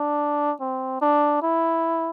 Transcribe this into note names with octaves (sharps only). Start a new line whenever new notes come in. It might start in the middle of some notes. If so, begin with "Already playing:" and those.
Already playing: D4
C4
D4
E4